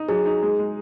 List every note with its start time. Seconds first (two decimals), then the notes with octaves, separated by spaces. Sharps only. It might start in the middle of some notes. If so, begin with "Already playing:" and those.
Already playing: D#4
0.09 F#3 G#4
0.26 D#4
0.42 G#3
0.59 G#3